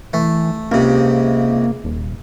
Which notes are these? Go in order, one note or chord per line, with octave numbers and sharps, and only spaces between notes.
E3 A3
C#2 C3 A#3
D#1